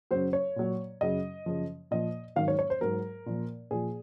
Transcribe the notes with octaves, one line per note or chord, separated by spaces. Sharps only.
F#2 C#3 F#3 C5
C#5
A#2 F#3
F#2 C#3 F#3 D#5
F#2 C#3 F3
A#2 F3 D#5
G#2 D#3 F#3 F5
C#5
C#5
C5
G#2 F#3 A#4
A#2 F3
A#2 F3 G#4